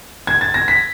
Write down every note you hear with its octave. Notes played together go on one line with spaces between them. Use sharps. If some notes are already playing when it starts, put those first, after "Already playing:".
G#6
A6
A#6
B6